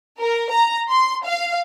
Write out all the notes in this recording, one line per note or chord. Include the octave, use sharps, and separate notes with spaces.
A#4
A#5
C6
F5